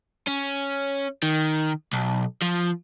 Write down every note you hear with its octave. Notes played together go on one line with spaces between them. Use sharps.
C#4
D#3
B1
F3